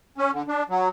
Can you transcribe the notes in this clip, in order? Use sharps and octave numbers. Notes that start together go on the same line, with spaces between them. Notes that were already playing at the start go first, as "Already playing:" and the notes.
C#4
D3
D4
F#3